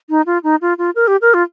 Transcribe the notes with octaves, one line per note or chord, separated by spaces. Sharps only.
D#4
F4
D#4
F4
F4
A#4
G4
A#4
F4